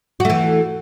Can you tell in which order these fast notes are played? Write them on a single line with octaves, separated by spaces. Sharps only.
F#4 A3 E3